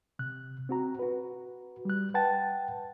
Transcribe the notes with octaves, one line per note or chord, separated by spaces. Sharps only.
C3 F#6
C4 F#4 A#5
F#4 B4
G3 F#6
B4 F#5 G5 A5 A6